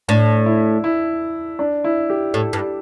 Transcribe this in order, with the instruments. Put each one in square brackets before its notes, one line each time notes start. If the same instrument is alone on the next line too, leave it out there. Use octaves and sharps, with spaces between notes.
[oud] A2 [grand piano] D4
[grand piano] E4
E4
D4
E4
G4
[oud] A2 [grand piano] A4
[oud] G2